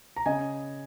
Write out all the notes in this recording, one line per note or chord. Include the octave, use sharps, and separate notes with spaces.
A#5
C#3 D#5 G#5